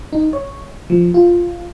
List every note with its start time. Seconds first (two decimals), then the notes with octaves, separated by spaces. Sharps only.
0.13 D#4
0.33 C#5
0.90 F3
1.14 F4